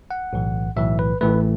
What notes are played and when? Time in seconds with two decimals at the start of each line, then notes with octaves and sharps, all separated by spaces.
0.11 F#5
0.33 B1 A2 E3
0.77 B1 A2 E3 E5
0.99 B4
1.21 A1 A2 E3 A3 B4